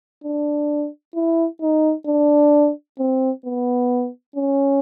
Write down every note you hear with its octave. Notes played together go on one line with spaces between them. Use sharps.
D4
E4
D#4
D4
C4
B3
C#4